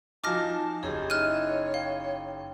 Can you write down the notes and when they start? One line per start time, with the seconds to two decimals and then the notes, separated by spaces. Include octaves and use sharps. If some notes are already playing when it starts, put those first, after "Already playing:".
0.24 F3 D#4 F#4 G#5 A5 D6 F6 A#6
0.83 F#1 D#4 G4 G#4 C#5
1.10 E4 D#5 E5 F6 F#6 D#7
1.74 F5 G5